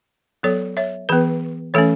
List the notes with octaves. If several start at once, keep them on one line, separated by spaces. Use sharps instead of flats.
F#3 B3 A4 C#5
C#5 E5
E3 B3 G#4 B4
E3 A3 C#4 A4 C#5